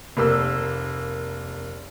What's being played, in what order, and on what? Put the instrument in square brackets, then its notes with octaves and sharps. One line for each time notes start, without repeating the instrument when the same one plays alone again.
[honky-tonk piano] F1 A#3 E6